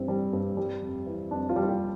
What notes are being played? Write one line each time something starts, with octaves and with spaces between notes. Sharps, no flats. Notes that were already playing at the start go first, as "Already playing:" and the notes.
Already playing: G2 E3 C4
G3
G2
G3
F2
E3
F2 D4
F4
G3
F4
G4